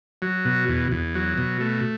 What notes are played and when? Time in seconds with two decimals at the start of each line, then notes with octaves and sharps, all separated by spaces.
0.22 F#3
0.45 B2
0.68 E2
0.92 E2
1.15 F#3
1.38 B2
1.60 A3